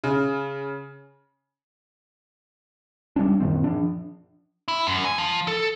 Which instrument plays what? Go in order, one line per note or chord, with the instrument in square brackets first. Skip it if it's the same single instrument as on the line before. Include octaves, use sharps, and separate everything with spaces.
[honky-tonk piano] C#3
[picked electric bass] G3 A3 C#4 D4
F#2 A#2 D#3 C4
F3 D4
[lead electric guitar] E4
F#2
G#5
F3
A4